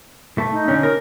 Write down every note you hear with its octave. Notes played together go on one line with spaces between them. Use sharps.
A3
D#4
D3 C#4
A#4